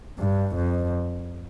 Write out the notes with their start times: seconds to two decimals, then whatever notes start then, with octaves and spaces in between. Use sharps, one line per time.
0.19 G2
0.56 F2